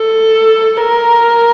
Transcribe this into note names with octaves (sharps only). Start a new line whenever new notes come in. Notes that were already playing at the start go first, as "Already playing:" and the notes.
Already playing: A4
A#4